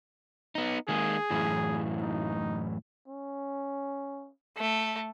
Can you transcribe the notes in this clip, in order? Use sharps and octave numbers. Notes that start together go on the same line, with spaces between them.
B3 D#4
D#3 G#3 A#3 G#4
F#2 A2 E3
D#4
C#4
A3